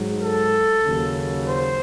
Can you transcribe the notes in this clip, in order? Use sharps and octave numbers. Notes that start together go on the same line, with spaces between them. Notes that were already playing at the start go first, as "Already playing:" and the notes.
Already playing: G#2 F#3
A4
D#2 C#3 F#3
C5